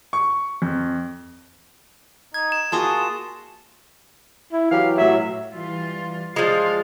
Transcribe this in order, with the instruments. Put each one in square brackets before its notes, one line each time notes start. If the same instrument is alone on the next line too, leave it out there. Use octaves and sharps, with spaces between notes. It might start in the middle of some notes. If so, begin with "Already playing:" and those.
[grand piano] C#6
F2
[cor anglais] D#4 [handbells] G#6
[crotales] E7
[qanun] A#3 F4 F#4 [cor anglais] G#4 [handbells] A5 C6 D#6
[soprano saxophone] E4
[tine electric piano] E3 F#3 G4 [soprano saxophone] F5
[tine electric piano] A2 F#3 [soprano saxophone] E5
[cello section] E3 G3 F4
[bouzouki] F3 G#3 [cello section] F4 D5 F5